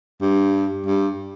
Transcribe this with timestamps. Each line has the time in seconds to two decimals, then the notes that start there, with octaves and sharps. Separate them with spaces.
0.21 G2
0.86 G2